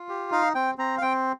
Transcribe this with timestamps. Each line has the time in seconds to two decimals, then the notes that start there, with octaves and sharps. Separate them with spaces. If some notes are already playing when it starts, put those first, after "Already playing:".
Already playing: F4
0.09 G4
0.32 D#4 F5
0.55 C4 G5
0.78 C4 A#5
0.98 F5
1.02 C4 G5